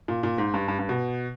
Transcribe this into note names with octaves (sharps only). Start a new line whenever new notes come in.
A#2
A#2
G#2
G2
G2
G2
B2